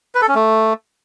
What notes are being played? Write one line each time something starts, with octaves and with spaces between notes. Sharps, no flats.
B4
A4
C#4
A3